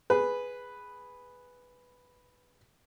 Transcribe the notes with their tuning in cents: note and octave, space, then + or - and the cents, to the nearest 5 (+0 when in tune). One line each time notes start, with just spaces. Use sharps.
G#4 +0 B4 +0